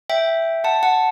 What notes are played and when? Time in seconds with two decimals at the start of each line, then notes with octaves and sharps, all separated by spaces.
0.09 E5 G5
0.64 F#5 A5
0.83 F#5 A5